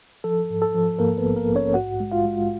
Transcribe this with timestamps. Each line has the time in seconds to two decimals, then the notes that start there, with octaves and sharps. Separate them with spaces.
0.24 F3 A4
0.50 G#2
0.62 A4
0.74 F3
0.99 G#2 A#3 A#4
1.18 B3 B4
1.24 A#1
1.36 A#3 A#4
1.49 A#1
1.55 C#4 C#5
1.74 G#2 F#4 F#5
2.00 G#3
2.12 F4 F5
2.25 G#3